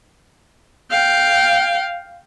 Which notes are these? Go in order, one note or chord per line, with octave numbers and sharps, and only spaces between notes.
F5 G5